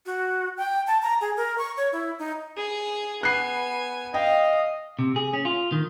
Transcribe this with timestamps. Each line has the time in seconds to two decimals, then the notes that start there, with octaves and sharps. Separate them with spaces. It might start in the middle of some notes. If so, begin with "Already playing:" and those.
0.06 F#4
0.57 G5
0.87 A5
1.02 A#5
1.21 G#4
1.37 A#4
1.58 C#6
1.77 C#5
1.92 E4
2.19 D#4
2.57 G#4
3.23 B3 G#5 F#6 C7
4.14 D#5 F5 G5
4.99 C3
5.16 G#4
5.34 C#4
5.45 F4
5.72 D#3